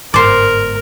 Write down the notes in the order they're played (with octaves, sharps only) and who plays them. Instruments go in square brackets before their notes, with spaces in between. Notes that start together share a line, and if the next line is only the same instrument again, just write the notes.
[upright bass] G1 G#2 [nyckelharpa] A#4 [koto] C5 D5